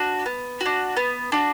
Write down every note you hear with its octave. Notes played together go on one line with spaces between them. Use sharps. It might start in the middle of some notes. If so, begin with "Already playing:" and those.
Already playing: D4 F#4
B3
D4 F#4
B3
D4 F#4